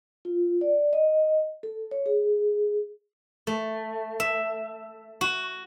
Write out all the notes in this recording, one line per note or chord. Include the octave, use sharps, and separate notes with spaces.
F4
D5
D#5
A4
C#5
G#4
A3
E5
F#4